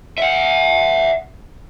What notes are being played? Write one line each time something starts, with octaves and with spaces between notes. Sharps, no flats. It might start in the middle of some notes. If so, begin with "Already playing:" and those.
E5 F#5